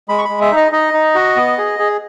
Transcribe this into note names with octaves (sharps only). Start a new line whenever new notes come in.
G#3 B5
C#6
G#3 B5
E5
D#4 D#5
D#4 D#5
D#4
F#4
B3
G#4
G#4